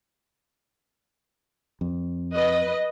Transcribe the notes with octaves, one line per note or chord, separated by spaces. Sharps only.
F2
B4 D#5